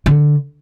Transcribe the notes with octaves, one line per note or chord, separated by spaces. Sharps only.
D3